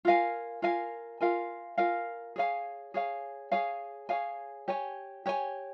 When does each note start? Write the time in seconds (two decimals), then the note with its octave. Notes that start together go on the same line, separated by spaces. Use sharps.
0.05 F4 A#4 F5 G#5
0.62 F4 A#4 F5 G#5
1.21 F4 A#4 F5 G#5
1.78 F4 A#4 F5 G#5
2.36 G#4 C#5 F5 G#5
2.94 G#4 C#5 F5 G#5
3.52 G#4 C#5 F5 G#5
4.09 G#4 C#5 F5 G#5
4.68 G4 C#5 G#5
5.26 G4 C#5 G#5